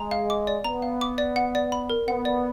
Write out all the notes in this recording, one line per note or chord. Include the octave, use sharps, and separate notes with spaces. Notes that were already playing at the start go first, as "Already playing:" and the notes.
Already playing: G#3 A#5
F5
D6
D5
B3 A#5
F5
D6
D5
F#5
D5
B5
A#4
B3 F#5
D5